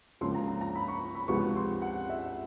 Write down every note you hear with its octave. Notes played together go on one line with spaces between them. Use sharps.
C#2 C#3 F3 A#3 C6
A#5
A#5
A#5
B5
C#6
B5
C#2 C3 F3 G#3 B3 C#6
C6
F#5
E5